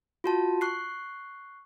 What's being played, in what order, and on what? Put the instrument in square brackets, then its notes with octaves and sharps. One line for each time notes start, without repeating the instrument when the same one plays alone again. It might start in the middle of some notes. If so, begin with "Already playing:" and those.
[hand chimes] F4 F#4 A5
C#6 F#6 C7